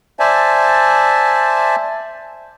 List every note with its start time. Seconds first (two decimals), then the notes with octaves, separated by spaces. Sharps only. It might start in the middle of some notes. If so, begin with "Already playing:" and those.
0.19 C5 D5 E5 G#5 A5